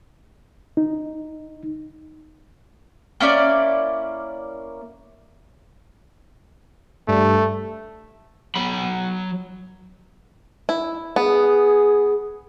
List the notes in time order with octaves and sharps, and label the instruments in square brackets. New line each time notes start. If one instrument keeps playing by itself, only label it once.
[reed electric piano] D#4
[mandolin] A#3 C#4 E4 D5
[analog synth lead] G2 [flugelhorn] A3
[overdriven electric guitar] F#3 B5
[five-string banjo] E4
[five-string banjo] B3 [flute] G#4